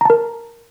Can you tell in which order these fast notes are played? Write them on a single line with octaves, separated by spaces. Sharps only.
A#5 A5 A#4